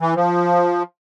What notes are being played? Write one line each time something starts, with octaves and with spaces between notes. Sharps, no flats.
E3
F3